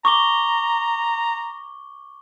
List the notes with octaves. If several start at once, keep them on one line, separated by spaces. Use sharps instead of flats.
A#5 C#6 D6 G7